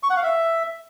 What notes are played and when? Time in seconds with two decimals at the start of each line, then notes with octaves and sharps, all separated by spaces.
0.03 C#6
0.10 F#5
0.17 F5
0.23 E5